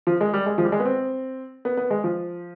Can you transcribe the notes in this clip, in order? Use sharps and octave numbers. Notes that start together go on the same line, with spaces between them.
F3
G#3
G3
G#3
F3
G3
G#3
B3
C4
B3
B3
G#3
F3